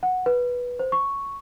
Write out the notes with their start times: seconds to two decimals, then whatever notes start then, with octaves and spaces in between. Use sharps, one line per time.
0.03 F#5
0.26 B4
0.79 C5
0.92 C#6